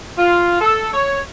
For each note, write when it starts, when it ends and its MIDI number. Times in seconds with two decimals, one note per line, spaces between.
0.16 0.57 65
0.60 0.89 69
0.93 1.19 73